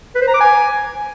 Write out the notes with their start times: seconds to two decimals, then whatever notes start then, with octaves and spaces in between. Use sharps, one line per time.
0.15 B4
0.22 C5
0.28 A#5
0.34 D6
0.40 G#5